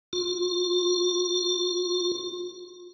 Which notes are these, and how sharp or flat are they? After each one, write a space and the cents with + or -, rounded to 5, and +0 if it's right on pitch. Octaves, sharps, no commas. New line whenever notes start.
F4 +35